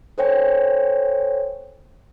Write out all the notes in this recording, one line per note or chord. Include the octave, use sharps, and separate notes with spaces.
A4 C5 C#5 G5 G#5